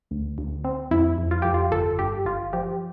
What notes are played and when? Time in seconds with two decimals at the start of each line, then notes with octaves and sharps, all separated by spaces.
0.11 D2
0.38 D2
0.64 C4
0.91 F2 E4
1.18 F2
1.31 F4
1.42 F2 G4
1.54 F4
1.72 G1 A4
1.99 G2 G4
2.25 G1 F4
2.53 F3 G4